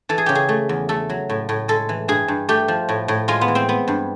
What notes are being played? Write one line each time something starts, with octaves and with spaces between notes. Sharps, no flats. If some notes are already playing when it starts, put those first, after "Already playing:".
E3 A4
G#4
C#3 G4
G#4
A3
E2
A3 A4
F#3
A2
A2
G#3 A4
E3
G2 G#4
G2
A3 G4
F3
A2
A2
G#3 F4
B3
E3
C4
B3
G2